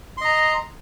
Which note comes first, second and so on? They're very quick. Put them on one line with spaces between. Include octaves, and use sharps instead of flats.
C6 D#5 A#5